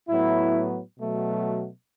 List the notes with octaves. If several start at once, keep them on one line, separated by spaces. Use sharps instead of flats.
A2 F#3 B3 E4
B2 F#3 A3